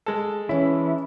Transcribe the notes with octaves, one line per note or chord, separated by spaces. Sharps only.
G#3 A4
E3 C#4 E4 C#5